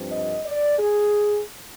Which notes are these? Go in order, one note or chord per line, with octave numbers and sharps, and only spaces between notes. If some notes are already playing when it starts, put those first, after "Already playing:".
Already playing: G2 F3 C4
D#5
D5
G#4